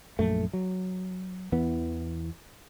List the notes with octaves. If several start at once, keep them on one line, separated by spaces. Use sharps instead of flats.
A#1 F#2 A3
F#3
E2 E3 B3